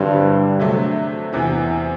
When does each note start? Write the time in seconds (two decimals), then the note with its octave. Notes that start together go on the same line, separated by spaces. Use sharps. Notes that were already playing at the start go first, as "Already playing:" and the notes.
Already playing: G2 D3 F#3 C4 E4
0.59 C3 F#3 A3 D4
1.33 E2 C3 E3